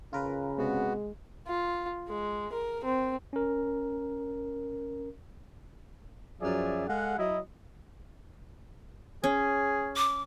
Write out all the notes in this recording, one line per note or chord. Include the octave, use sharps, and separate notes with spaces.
C#3 F4 A#4 B4
C3 G#3 B3 F#4
F4
G#3
A#4
C4
C#4 A#4
F#2 F3 F#3 G#4 D5 E5
G#3 G#4 A4 F5 F#5
F#3 E4 D#5
C#4 G#4
D6